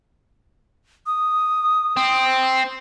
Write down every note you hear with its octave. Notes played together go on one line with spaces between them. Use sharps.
D#6
C4